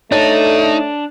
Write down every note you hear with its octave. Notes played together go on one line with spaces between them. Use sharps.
A3 D4 D#4 A4 C#5 A6